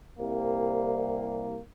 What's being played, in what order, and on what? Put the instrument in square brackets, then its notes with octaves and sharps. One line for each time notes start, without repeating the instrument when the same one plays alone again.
[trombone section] C2 A#3